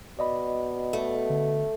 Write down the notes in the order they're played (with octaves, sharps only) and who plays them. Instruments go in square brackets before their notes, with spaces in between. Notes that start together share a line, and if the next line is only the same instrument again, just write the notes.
[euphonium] B2 [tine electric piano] D5 D#5 B5
[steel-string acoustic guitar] A3
[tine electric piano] D3